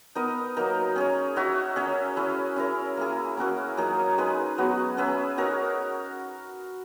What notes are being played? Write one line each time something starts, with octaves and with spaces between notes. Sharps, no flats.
B3 D#4 A#4 D#5
F#3 A#3 D#4 A#4
C#4 G#4 C#5
D#4 F#4 C#5 E5
C#4 G#4 C#5 E5
C#4 E4 G#4
C#4 E4 A#4
A#3 E4 G#4
A#3 C#4 F#4 A#4
F#3 A#3 D#4 G#4
G#3 D#4 G#4 B4
F#3 B3 F#4
C#4 G#4 B4 E5
D#4 F#4 A#4 C#5